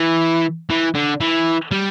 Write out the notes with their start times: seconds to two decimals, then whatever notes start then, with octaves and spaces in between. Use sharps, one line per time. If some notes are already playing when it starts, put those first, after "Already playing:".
Already playing: E3
0.70 E3
0.95 D3
1.21 E3
1.72 G3